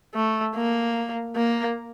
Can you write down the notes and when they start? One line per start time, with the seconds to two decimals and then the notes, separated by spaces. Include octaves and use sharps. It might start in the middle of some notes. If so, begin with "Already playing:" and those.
0.14 A3
0.55 A#3
1.36 A#3